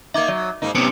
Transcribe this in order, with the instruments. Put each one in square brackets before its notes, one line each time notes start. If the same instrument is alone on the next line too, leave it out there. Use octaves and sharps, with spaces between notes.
[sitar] A#3 D#4 [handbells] E5 D6 G#6
[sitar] F#3 [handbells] D5
[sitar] G#2 A#3 D#4
[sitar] C3 [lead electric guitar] B3 C#4 [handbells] C#7 D7